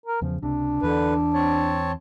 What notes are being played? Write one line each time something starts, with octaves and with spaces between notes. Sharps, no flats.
A#4
E2 C#3 F3
C#2 C3 D4
E2 D3 E3 B4
C4 C#5 A5